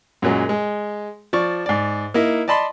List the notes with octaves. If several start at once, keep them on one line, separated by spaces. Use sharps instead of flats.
F#2 A#2 F#3 G#3
G#3
F3 D5 C#6
G#2 D5
A#3 D#4 E4
D5 D#5 A5 B5 C6